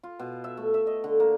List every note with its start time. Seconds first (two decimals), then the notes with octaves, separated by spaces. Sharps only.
0.03 F4
0.19 B2
0.44 E5
0.57 A3
0.74 E5
0.87 D#5
1.04 D3
1.20 A#3